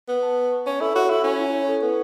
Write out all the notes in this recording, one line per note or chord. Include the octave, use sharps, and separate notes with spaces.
B3 B4
A5
B4
C#6
C#4 C#6
E4 A4
F#4 C#5
E4 A4
C#4 C#5
E4
C#5
A4
B3 C#6